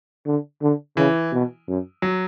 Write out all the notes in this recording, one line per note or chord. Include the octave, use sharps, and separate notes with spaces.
D3
D3
C#3 E3
B2
F#2
F#3